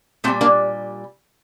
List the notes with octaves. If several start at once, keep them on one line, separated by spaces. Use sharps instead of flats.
A#2 G3 A3 C4
A#3 D4